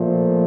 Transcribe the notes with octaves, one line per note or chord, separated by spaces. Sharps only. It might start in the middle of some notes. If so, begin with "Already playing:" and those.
Already playing: A#2 F3 A3